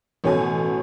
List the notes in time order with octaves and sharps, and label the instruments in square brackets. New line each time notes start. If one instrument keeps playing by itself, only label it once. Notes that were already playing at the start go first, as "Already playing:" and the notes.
[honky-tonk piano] A1 B2 C#4 A4 G#5